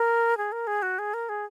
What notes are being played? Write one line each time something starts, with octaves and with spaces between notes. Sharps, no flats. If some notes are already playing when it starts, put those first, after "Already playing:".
Already playing: A#4
G#4
A#4
G#4
F#4
G#4
A#4
G#4